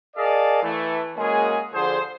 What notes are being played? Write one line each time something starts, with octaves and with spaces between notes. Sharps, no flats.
G#4 A#4 D5 D#5 F5 A5
E3 A3
G#3 A#3 C#4 F#4 G#4
D3 F3 G3 G#4 C5